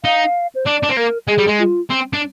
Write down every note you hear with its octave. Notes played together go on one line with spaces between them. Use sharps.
D#4 F5
C5
D4 D5
D4
C4
A#3 A#4
G#3 G#4
G3
G#3
F4
C4
D4